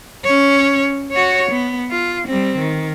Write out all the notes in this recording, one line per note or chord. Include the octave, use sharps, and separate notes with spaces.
C#4 C#5
F#4 C#5
B3
F4
G3 C4
D#3